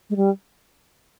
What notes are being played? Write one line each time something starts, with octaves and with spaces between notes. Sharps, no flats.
G#3
G3